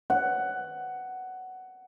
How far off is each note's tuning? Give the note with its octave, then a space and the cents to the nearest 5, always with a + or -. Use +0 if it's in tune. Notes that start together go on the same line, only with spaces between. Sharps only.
F#5 +10